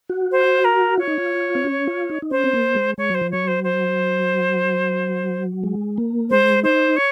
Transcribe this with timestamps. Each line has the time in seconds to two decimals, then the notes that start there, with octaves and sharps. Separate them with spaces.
0.09 F#4
0.31 C5
0.65 A#4
0.98 F4 C#5
1.08 D#4
1.18 F4
1.55 C4
1.64 C#4
1.87 F4
2.09 D#4
2.22 D#4
2.31 C#4 C5
2.44 C4
2.53 A#3
2.75 G#3
2.98 G#3 C#5
3.10 F#3 C5
3.21 F3
3.31 F#3 C#5
3.48 C5
3.64 C5
5.63 G#3
5.98 A#3
6.30 G#3 C5
6.63 D#4 C5
6.97 C#5